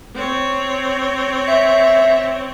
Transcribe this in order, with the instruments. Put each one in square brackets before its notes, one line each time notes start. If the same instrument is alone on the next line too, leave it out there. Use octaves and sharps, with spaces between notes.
[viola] C4 C#5
[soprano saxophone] E5